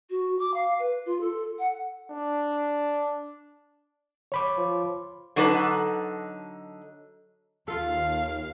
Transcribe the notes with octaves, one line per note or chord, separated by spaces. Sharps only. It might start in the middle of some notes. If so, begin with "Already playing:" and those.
F#4
D6
F5
B4
F4
A4
F#5
D4
C#5 B5 D6
F3
D3 F#3 D#4 A4 B4
D#2 F4 A4 F5